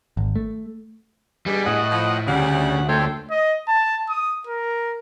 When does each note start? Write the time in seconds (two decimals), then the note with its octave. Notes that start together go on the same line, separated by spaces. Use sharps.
0.17 G#1
0.36 A3
1.46 G2 B2 G3 G#4
1.66 A2 D#5 F#5
1.90 F3
2.27 D2 C#3 G3 D4 F#5
2.89 F2 B2 A3 C#5 G5 C6
3.31 D#5
3.68 A5
4.09 D#6
4.47 A#4